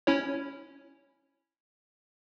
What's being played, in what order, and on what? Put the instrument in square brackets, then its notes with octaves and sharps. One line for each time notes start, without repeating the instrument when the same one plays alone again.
[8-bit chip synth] C#4 E4 C#5